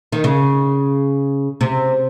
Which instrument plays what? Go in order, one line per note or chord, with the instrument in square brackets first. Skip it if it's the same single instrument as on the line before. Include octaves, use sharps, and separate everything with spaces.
[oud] D#3
C#3
C3